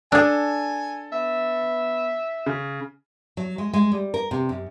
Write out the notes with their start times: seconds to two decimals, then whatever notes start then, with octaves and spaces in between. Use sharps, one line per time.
0.12 D4 G#4 A4 G#5 E6
1.12 B3 E5
2.46 C#3
3.37 F#3
3.58 G#3
3.73 G#3
3.92 G3
4.14 A#4
4.31 C3
4.49 F#2